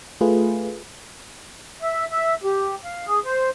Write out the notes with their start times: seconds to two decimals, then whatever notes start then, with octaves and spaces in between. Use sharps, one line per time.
0.21 A3 F4 G#4 B4
1.82 E5
2.12 E5
2.44 G4
2.85 F5
3.07 G#4
3.25 C5